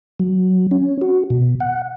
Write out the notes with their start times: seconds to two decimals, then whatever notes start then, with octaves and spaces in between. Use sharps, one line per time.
0.20 F#3
0.71 C#4
1.01 F#4
1.30 B2
1.60 F#5